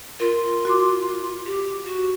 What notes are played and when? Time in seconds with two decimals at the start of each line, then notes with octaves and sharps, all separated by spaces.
0.20 F4 A#4
0.65 F#4 C6 D6
1.46 G4
1.86 F#4